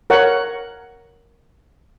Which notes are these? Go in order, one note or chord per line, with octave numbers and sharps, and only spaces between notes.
A#4 C#5 F#5